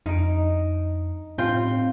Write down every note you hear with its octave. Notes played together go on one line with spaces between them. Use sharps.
F2 D#4 D7
A2 C4 F4 G5